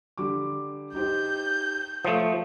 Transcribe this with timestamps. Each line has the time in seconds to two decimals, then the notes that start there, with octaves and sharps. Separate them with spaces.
0.17 D3 G3 D6
0.94 D#4 G4 C5 G6
2.05 F3 A3 C#5 D#6